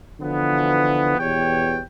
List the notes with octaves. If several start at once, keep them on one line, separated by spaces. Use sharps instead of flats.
D3 E3 F3 B3
E2 B2 G4 C#5 G5